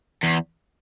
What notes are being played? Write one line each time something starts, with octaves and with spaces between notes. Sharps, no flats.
E2